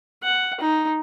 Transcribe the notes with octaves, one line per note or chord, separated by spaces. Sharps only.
F#5
D#4